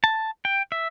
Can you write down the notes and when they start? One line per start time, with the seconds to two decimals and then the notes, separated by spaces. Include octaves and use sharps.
0.04 A5
0.45 G5
0.72 E5